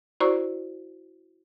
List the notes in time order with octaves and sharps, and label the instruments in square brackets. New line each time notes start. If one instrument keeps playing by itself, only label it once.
[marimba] E4 F#4 C5 D5 A#5 C#6